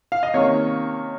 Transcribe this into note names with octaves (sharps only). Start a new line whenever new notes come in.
F5
D#5
C3 D#3 A#3 C#4 C#5